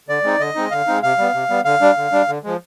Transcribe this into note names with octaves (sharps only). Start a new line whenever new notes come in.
D3 D5
G#3 C4 D#4
D3 D#5
G#3 C4 D#4
D3 F5
G#3 C4 D#4
C3 F5
G3 B3
C3
G3 B3
D3 F5
G3 D4
D3
G3 D4
D3
F3 G#3